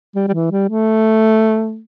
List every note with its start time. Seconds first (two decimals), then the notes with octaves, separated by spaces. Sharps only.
0.15 G3
0.28 G3
0.34 E3
0.52 G3
0.69 A3